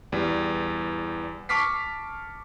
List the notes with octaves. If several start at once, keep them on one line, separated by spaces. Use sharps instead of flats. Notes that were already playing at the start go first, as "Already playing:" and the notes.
E2 G3
A5 C#6 D6 F6 B6 C7